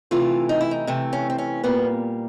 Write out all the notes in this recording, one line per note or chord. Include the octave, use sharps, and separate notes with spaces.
C3 E3 A3 F4
D#4
E4
D#4
C3 E3 A3
C#4
C4
C#4
A#2 G3 A#3 B3